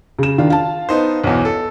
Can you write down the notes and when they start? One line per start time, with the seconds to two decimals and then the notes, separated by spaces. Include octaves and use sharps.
0.19 C#3 E7
0.38 D#3 D4 F4
0.50 F5 A5
0.89 B3 D#4 C5
1.24 B1 E2
1.45 A4